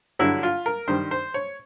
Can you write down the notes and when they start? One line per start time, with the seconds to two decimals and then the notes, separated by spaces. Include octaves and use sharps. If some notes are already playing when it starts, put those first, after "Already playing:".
0.19 G2 D3 F#3 E4
0.43 F4
0.66 A#4
0.88 G2 D#3 G3 C5
1.11 C5
1.34 C#5